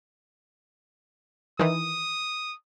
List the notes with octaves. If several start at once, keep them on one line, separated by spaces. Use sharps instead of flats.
D#3 E3 D#6